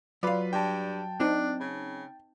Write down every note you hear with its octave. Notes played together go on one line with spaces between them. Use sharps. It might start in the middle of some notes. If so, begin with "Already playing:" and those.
F#3 F4 B4 D5 F5 B5
G2 G5 A5
C4 D4 D#4
C#3